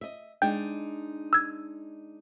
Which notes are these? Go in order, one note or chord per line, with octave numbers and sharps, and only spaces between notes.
D#5 E5
G#3 D4 D#4 G5 G6
E6 G#6